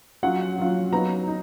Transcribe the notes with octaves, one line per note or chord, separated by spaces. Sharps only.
F#3 C#4 F4 F#5
F#3 C#4 F4
F#3 B3 D#4 A#5
D#4